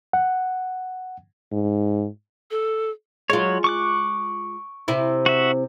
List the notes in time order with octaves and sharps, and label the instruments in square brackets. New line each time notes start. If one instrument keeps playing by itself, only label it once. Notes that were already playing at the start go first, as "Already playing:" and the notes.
[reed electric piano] F#5
[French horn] G#2
[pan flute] A4
[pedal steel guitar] F#3 C#5 [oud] G#3 F4
[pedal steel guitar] C#6 D6 F#6
[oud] C3 E4
[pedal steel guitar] F#4 E5